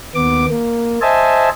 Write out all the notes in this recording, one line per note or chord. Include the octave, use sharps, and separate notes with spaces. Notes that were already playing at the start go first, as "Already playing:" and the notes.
D#2 B3 D6
A#3
C5 D#5 E5 G#5 A5